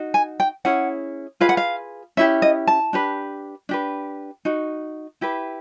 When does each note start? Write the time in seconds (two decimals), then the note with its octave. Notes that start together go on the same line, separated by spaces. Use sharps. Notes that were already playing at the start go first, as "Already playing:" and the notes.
Already playing: D#4 F#4
0.14 G#5
0.40 G5
0.65 C#4 E4 G#4 F#5
1.40 F4 G#4 B4 F5
1.49 F#5
1.57 F5
2.17 C#4 E4 G4 E5
2.42 D#5
2.67 A5
2.93 D4 G4 B4
3.69 D4 G4 B4
4.45 D#4 F#4
5.21 E4 G4 B4